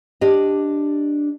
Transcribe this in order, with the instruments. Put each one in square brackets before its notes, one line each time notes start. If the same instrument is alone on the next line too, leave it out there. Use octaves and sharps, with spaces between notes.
[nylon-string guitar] D4 G4 D5 D#5